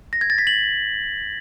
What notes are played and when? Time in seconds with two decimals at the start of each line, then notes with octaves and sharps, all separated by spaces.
0.13 A#6
0.21 G#6
0.30 A6
0.38 B6
0.47 F#7